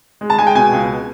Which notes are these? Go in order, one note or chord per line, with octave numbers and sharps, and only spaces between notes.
G#3
A5
G#3 G#5
G5
B2 G#5
C#2